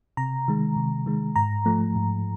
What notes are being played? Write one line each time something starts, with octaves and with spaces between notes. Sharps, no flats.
C3 A#5
D#3 G#3
C3
D#3 G#3
G#2 A#5
F3 A3
G#2